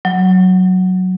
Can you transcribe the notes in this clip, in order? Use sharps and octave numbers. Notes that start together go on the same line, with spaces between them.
F#3